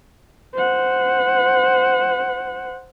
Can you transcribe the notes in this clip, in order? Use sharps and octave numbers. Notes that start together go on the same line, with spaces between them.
C5 F#5